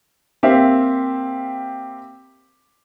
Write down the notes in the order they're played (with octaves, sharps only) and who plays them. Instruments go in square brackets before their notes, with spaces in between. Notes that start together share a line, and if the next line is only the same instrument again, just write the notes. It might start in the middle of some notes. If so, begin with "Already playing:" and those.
[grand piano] A#3 C4 G4 C5 E5 F5